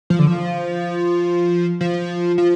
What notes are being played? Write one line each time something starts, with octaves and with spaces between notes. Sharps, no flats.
F3
D3
F3
F3
F3